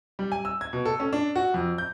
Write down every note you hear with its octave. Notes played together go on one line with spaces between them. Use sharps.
G3
G#5
E6
G#6
B2
A4
C#4
D4
F#4
F2
G6